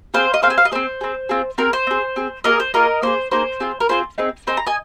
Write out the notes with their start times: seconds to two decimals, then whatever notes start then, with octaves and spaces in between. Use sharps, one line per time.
0.14 C4 G#4 C5 F5
0.34 D#5
0.42 G#4 C5 F5
0.47 C4 G#5
0.58 F5
0.65 D#5
0.71 C4 G#4 C5
1.01 C4 G#4
1.29 C4 F4 G#4
1.58 C4 F4 G#4 A#4
1.73 C5
1.87 C4 G#4
2.16 C4 G#4
2.44 A#3 F4 A#4 D#5
2.49 G#4
2.60 C5
2.74 A#3 F4 G#4 A#4 D#5
3.02 A#3 D#4 G#4 C5
3.31 A#3 D#4 G#4 C5
3.60 C4 F4 G#4
3.80 A#4
3.89 C4 F4 G#4 C5
4.18 C4 D#4 G#4
4.47 C4 D#4 G#4 C5
4.57 A#5
4.66 D#5 G#5